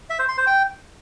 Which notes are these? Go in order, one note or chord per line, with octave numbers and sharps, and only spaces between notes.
E5
C5
C6
C5
G5